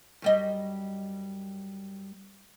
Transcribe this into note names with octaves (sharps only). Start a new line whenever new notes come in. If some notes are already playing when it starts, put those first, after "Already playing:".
F#2 G3 D#5